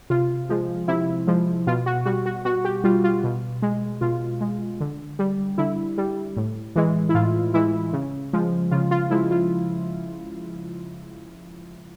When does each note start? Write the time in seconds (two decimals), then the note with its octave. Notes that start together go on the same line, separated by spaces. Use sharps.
0.10 C3 F4
0.49 F3 G#3
0.88 C3 E4
1.28 F3 G#3
1.67 B2 F4
1.86 F#4
2.05 G3 F#4
2.26 F#4
2.45 B2 F#4
2.65 G4
2.84 G3 F4
3.04 F4
3.24 B2
3.62 G#3
4.01 B2 F4
4.41 G#3
4.80 D3
5.19 G3
5.58 D3 E4
5.98 G3
6.37 A2
6.76 E3 G#3
7.09 E4
7.15 A2 F4
7.54 E3 G#3 E4
7.93 C#3
8.33 F3 G#3
8.71 C#3 F4
8.91 F4
9.10 F3 G#3 E4
9.31 F4